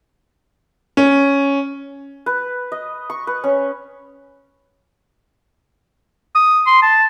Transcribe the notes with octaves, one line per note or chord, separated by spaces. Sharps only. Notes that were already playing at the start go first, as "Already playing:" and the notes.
C#4
B4
D#5
C#6
B4
C#4
D#6
C6
A5